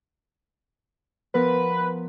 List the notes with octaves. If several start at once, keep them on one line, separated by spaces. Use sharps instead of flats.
F3 B3 A#4 B4